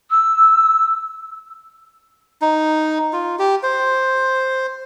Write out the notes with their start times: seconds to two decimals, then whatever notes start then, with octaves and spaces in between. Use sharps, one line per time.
0.10 E6
2.42 D#4
3.13 F4
3.39 G4
3.63 C5